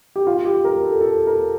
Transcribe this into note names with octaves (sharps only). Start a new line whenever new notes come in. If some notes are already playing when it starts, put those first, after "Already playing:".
G4
F4
G4
A#4
A4
A4
A#4